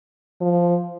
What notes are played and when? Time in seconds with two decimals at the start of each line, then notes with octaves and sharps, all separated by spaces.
0.41 F3